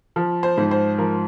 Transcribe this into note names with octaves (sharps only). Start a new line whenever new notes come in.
F3
C5
G#2
C5
F3 A#4